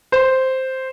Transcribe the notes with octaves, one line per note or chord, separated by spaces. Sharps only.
C5